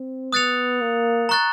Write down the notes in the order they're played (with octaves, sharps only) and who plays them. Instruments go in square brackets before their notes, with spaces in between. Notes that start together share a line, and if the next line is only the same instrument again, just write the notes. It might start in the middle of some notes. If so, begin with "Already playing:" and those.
Already playing: [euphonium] C4
[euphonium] B3 [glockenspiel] D#6 F#6 A6 C#7 F7
[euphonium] A#3
[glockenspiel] A#5 C#6 F#6 A6